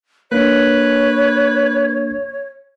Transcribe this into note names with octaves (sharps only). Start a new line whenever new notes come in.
A#3 D4 B4 C#5